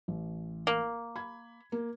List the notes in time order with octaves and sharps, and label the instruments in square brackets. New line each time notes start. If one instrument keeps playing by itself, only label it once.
[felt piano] A1
[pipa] A#3
[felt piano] B5 G#6
A#3